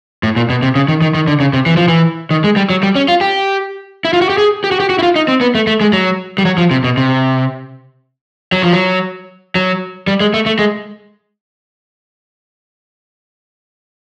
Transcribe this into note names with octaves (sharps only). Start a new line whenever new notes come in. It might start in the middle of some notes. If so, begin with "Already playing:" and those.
A2
A#2
B2
C3
C#3
D#3
D#3
D#3
D3
C#3
C3
E3
F3
E3
D#3
G#3
G3
F#3
G3
C#4
F4
G4
E4
F4
F#4
G4
G#4
G4
F#4
G4
F#4
E4
F4
D#4
C4
B3
A3
A3
G#3
F#3
G3
F#3
F3
C3
B2
C3
F#3
F3
F#3
F#3
G3
G#3
A3
A3
G#3